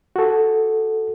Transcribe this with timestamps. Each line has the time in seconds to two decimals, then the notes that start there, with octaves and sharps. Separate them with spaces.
0.16 F#4 A4